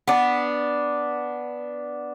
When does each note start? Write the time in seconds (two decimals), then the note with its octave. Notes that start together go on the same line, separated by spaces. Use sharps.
0.08 B3 D4